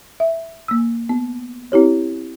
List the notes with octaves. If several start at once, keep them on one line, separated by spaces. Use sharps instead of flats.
E5
A#3 E6
B3
C4 E4 G4 C#5